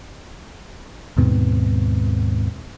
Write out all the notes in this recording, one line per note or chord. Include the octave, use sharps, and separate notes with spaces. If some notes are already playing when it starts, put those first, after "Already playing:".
D#2 G#2 B2 C4